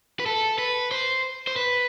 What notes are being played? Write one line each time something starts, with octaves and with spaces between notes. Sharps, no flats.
B4
A4
B4
C5
C5
B4